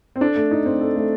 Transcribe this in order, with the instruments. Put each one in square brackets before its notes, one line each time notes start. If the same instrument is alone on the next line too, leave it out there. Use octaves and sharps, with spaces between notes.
[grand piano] C4
[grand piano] D4 [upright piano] A4
[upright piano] A3
D#4
C4
A4
A3